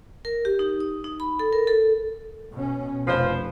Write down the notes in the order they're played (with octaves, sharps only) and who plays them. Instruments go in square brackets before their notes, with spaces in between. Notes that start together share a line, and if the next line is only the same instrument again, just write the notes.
[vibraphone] A#4
G4
D#4
D#6
D#4
B5
A4
A#4
A4
[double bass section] B2 C#4
[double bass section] F1 [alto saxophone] F3 [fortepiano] B4 C5